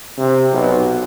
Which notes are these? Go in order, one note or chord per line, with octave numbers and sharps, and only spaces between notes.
C3
B1